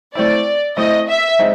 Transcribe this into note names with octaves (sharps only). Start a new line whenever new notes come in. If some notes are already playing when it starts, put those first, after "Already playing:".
A3 C4 E4 D5
A3 C4 E4 D#5
E5
G#3 C4 D#4